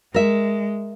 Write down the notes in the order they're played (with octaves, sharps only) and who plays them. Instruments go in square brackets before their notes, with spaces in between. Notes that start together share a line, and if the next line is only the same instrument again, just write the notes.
[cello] G#3 [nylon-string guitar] A#4 E5